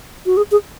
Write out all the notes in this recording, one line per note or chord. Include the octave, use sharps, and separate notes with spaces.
F#4
G#4
G#4